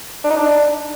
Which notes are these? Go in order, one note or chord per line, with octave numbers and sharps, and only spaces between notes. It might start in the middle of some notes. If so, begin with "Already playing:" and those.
D4
D#4
D4